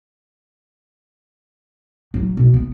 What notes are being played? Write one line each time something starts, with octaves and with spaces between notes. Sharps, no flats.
F#3
B2
B3